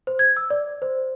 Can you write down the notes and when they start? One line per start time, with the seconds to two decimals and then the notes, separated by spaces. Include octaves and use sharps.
0.07 C5
0.19 G#6
0.37 E6
0.50 D5
0.82 C5